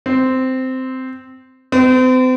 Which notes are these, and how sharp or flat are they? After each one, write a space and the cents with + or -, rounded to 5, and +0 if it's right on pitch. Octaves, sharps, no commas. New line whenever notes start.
C4 -10
C4 -40